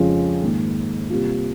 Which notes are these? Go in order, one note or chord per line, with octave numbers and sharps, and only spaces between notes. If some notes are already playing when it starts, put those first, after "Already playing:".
Already playing: F2 C#3 G#3 C#4 F4
G#2 D#3 A#3
C3 G3 A#3 F4